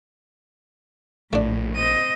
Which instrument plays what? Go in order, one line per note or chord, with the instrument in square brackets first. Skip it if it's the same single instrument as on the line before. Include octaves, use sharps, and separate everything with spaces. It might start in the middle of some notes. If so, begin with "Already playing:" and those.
[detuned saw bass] A#1 [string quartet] A2 [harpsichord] A3 D4
[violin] C4 D#7 [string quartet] D#5